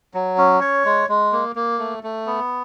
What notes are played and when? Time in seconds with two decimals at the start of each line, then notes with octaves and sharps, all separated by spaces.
0.14 F#3
0.38 C#4
0.61 C#5
0.85 G#3
1.09 G#3
1.32 A#3
1.56 A#3
1.79 A3
2.03 A3
2.26 B3